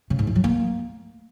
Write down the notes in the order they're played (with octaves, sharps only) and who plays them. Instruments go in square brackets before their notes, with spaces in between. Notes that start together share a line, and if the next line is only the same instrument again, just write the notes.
[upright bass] C#3
G#2
E3
F#3
A#3